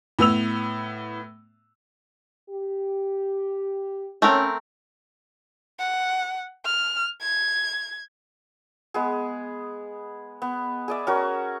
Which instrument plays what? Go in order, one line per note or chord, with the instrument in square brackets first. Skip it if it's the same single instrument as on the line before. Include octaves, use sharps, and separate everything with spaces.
[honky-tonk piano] A2 B3 E6 F7
[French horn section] G4
[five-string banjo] A3 C4 A#4 [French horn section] C#4
[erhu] F#5
F6
G#6
[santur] G#3 B3 G#4
B3
G#4 D5 E5
C#4 F#4 A#4